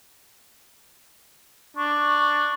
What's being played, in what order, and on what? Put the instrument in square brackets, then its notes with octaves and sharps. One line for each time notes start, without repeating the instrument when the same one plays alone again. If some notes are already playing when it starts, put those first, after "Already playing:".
[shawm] D4 [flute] C#6